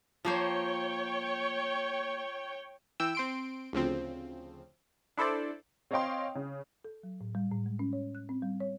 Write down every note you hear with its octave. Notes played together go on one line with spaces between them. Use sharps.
F3 A#3 C5 C#5 G5
E3 G5 E6
C4 C6 D7
D2 C#3 F3 C4
D4 E4 A4 C5 D5
C4 C#5 D#5 F5 G5 C6
C#3
A4
F#3
A2
G3
A2
G#3
C#4
C#5
F#6
C4
G3
C#5